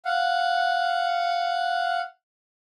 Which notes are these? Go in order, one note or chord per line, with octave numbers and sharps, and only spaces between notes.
F5 F#5